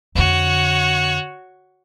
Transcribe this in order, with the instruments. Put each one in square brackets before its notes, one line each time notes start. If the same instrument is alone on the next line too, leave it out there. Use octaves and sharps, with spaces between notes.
[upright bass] F2 D3 [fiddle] F#4 C#5